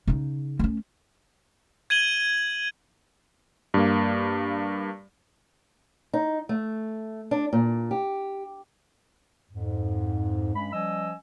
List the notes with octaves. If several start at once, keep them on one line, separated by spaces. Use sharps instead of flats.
C#3 D#4
A3 C#4
G#6 D#7 F#7 G7
G2 A#3
D#4
A3
D4
A#2
G4
F2 G#2
G2 G#3 C#4 B5
F3 G3 C#4 D#5 G#5 E6